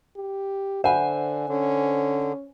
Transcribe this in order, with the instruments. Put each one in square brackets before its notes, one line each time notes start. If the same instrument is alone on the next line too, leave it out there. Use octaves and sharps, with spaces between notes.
[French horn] G4
[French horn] D3 [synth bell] C5 G#5 [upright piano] E5 F#5 B5
[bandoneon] D3 [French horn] C#4